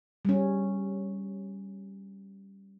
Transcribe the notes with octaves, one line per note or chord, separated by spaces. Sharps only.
G3 C#4